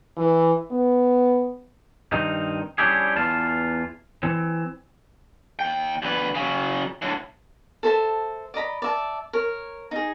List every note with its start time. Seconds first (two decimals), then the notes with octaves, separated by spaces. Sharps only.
0.17 E3
0.71 B3
2.12 G2 D#3 C4 D#4
2.78 G3 C#4 D4 E4 G4 G#4
3.16 E2 E3 F4 A5
4.23 E3 C4
5.59 D#2 G5
6.02 D2 B4
6.35 C#3 F#3
7.02 A2 D3
7.83 A4 C5 E5 A5
8.54 D5 D#5 A#5 B5
8.82 D5 E5 A5
9.33 A#4 C#5
9.91 D#4 G#4